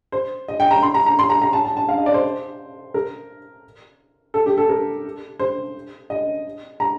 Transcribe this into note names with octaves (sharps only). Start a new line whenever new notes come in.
C5
D#5
G5
A#5
C6
A#5
A#5
C6
A#5
A#5
A5
A5
A5
F5
D#5
D5
C5
A#4
A4
G4
A4
A#4
C5
D#5
A#5